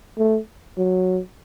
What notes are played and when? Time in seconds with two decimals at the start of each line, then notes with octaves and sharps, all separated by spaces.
0.18 A3
0.78 F#3